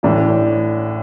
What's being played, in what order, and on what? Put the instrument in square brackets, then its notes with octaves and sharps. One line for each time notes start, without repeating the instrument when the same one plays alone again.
[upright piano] A1 A2 E3 D4